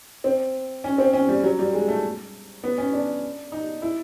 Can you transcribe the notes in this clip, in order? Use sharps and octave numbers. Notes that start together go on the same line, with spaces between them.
C4
C#4
C4
C#4
G3
F#3
G3
G#3
A3
B3
C#4
D4
D#4
E4